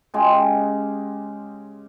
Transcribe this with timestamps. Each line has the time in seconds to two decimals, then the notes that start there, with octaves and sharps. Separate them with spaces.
0.14 C#3 G#3 G4